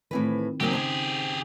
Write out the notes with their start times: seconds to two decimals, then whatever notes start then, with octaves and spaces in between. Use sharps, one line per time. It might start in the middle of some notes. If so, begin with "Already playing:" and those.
0.11 A2 D#3 E3 C4 B4
0.60 C#3 F#3 A#3 C4 D#4 G4 G#4 F#5
0.73 C5 G#5